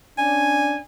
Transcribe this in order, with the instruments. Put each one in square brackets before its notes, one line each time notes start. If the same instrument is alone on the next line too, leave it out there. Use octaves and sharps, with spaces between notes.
[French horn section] C#4 D4 [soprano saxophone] G#5